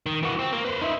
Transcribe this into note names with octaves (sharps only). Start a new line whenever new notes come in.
D#3
E3 F#4
C4
A#3
B4 C5
D#4 E5